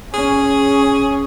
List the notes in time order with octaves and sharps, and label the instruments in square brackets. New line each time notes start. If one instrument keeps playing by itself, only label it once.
[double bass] C#4 [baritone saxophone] G#4